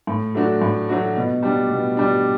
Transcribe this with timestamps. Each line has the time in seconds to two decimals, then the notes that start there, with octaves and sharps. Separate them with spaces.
0.07 A2
0.35 F#3 A3 D4 F#4
0.61 A2
0.89 F#3 A3 D4 F#4
1.16 B2
1.43 G3 D4
1.70 B2
1.97 G3 D4